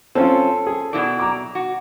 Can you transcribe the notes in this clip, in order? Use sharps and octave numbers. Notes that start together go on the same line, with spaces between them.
C4 C#4 F4 A4
G#4
B2 E4 D5
A#5 D6
F#4